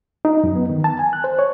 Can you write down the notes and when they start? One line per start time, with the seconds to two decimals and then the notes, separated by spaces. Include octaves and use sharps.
0.25 D#4
0.44 F#2
0.55 B3
0.69 D#3
0.84 A5
0.99 G#5
1.13 F#6
1.24 C5
1.39 C#5